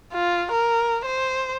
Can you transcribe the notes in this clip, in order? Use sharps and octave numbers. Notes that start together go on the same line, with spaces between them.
F4
A#4
C5